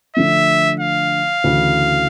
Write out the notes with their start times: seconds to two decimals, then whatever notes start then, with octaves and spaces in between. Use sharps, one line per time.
0.16 D3 F3 A3 E5
0.80 F5
1.44 D2 C#3 E3